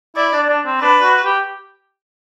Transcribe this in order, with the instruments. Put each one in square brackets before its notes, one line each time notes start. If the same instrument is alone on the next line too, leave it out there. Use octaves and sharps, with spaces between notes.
[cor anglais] E4 [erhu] D5
[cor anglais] D4
D4
C4
[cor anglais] D4 [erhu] B4
[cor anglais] F#4
G4